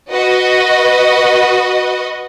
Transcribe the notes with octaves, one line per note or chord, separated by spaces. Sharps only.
F#4 B4 D#5